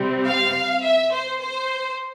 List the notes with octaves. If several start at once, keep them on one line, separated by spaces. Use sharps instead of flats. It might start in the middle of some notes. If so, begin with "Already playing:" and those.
Already playing: C3 G3 C4
F5
E5
C5
C5